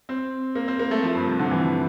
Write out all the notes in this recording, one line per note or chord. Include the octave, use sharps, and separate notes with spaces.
C4
A#3
C4
A#3
A3
F3
G2
C3
D3
E3